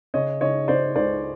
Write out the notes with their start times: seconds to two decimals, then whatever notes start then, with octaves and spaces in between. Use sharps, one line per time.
0.14 C#3 C#5 D#5
0.41 C#3 C#5 D#5
0.68 C#3 C5 D5
0.95 C#2 C5 D5